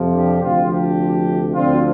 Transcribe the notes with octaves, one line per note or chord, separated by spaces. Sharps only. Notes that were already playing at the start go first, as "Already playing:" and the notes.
Already playing: F2 C3 F3
D4 G4
D2 C3 F3 C4 F4
D4 G4
D2 D3 F3 C4 F4